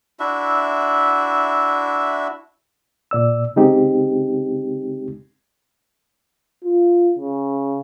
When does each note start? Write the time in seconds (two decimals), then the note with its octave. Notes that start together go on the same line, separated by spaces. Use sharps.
0.20 D4 E4 F#4 E5
3.11 A#2 D5 E6
3.56 C#3 G#3 C4 D#4 G4
6.64 F4
7.19 C#3